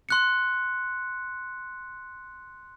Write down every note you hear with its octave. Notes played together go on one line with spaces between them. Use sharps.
C6 F#6 C#7